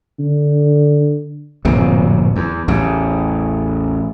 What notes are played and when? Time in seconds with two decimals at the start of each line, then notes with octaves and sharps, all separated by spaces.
0.20 D3
1.65 D1 A#1 F#2 C3
2.36 E2
2.68 A1 E2 C#3